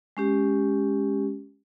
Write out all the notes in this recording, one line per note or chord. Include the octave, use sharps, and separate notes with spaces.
G#3 C#4 G4